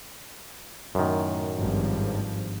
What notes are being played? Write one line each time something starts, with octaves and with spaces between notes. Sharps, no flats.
F#2 A2 D#3
G#1 G2 F3